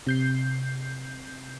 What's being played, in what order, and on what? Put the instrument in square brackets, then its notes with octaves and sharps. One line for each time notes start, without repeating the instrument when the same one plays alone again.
[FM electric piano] C3 G6 C7